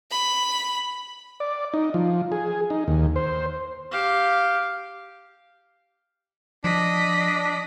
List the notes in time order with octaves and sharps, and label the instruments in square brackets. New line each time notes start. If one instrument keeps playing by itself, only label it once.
[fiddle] B5
[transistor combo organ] D5
D#4
F3
G#4
D#4
D#2
C5
[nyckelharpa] G4 F5
[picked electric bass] F3 [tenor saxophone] D4 [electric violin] D#5 B6